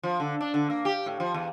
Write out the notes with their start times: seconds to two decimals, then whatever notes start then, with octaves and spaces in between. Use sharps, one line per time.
0.03 F3
0.20 D3
0.41 D4
0.54 D3
0.70 A#3
0.85 G4
1.06 A2
1.20 F3
1.34 E2